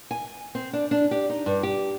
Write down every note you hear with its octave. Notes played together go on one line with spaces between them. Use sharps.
G#5
C4
D4
D4
G4
D#4
G2
G4